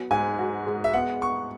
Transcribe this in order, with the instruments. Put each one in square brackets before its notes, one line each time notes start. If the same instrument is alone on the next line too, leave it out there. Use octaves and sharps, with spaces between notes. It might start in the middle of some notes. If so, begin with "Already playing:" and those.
Already playing: [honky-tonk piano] F#3 B3
[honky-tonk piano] G#2 [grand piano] G#5
[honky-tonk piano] F#4
G#3
[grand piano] E5
[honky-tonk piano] B3 [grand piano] F#5
[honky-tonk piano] B3 [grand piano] C#6